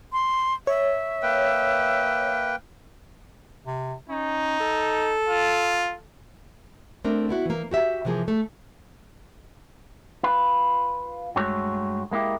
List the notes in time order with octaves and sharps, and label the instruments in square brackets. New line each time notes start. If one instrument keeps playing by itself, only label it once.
[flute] C6
[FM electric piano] C#5 [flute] E5
[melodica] A#3 B4 G5
[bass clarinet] C3
[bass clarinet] C#4 [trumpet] D#4
[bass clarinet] A4
[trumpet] F4
[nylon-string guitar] A3 C4 D4 A#4
B3 E4 F#4
E3 A#3
F#4 G4 E5
C3 E3 F3 A#3 G#4
A3 A4
[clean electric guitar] F4 B4
G2 G#3 A3 F#4 C#5
G#3 A#3 E4 G4